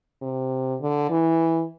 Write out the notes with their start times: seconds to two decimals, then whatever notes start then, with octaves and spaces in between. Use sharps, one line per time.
0.22 C3
0.81 D3
1.10 E3